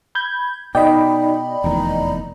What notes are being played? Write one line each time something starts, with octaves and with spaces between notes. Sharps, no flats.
B5 G6 G#6
B2 D#4 D5 D#5 G5 B5
F1 E2 D#3 A#5